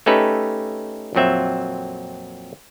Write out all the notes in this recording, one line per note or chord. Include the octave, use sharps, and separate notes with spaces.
A3 C#4 D#4 G4 A4 B4
F2 A#2 F#3 C4 E5